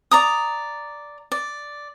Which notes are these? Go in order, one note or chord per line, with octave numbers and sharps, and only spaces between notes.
D5 A#5 D#6
D5